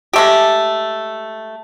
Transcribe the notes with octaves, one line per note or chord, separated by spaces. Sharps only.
G#3 A3 G4